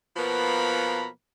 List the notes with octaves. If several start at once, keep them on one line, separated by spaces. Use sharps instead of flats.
B2 F3 A#3 B3 A#5 B5